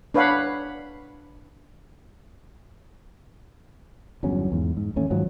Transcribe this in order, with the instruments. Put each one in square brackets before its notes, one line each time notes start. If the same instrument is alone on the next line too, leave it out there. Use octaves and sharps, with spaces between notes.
[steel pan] D4 B4 C#5 F5 F#5 B5
[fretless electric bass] G1 E2 F#3 C#4
E2 G#2
G#2
A1 D#2 A3 C#4
G#2 D#3 F3 F#3